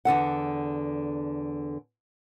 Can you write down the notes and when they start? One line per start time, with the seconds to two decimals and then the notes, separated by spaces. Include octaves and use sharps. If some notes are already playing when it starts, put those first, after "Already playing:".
0.05 E2 D3 A4 F#5